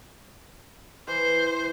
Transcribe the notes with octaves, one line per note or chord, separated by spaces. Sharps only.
E3 C5